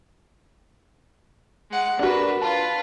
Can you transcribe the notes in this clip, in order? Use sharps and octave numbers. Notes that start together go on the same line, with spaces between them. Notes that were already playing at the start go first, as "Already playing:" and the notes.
G#3 F#5
D4 F#4 A#4 B4
F4 B4 A5